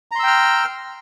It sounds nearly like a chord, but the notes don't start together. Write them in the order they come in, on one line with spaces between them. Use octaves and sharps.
A#5 C6 E6 G5 F6